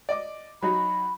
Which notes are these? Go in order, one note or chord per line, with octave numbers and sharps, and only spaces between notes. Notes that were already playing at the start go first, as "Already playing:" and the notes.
D5 D#5 D6
F#3 D#4 F#4 B5